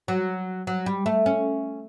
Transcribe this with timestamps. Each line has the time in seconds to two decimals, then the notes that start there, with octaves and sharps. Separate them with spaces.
0.08 F#3
0.67 F#3
0.86 G3
1.06 A3
1.26 C#4